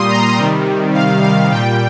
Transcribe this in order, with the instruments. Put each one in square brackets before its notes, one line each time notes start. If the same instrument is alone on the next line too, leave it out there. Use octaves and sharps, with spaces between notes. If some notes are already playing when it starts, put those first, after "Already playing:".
Already playing: [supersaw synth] A#2 G3 C6 D#6
A#5
C3 D#3 G3
F5
F5
A#2 G3 G5